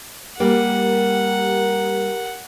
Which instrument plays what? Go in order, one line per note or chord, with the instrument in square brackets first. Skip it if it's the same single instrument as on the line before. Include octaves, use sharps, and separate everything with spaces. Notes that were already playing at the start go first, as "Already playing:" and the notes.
[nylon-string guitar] G3 A#3 [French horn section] G4 A#4 [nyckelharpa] F#5